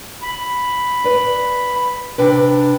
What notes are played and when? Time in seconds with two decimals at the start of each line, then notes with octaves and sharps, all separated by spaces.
0.22 B5
1.04 B4 D5
2.18 C3 D4 B4